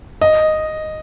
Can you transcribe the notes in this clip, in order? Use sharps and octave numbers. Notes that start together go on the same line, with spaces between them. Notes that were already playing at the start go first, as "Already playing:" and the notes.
D#5